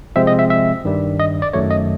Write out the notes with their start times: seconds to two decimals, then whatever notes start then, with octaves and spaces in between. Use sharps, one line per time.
0.16 C3 F3 G#3 C4 E5
0.27 D#5
0.39 E5
0.50 E5
0.85 G2 D#3 G3
1.20 D#5
1.42 D5
1.53 F#2 D#3 F#3 A3 C#5
1.71 D#5